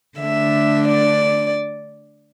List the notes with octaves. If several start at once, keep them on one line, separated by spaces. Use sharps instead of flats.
D3 A3 D4 E5
D5